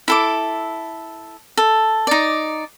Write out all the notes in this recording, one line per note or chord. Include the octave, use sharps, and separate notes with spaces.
E4 A4 D6
A4
D#4 D5